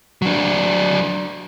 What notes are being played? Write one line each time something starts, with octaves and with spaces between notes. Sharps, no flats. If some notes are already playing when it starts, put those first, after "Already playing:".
F#3 D4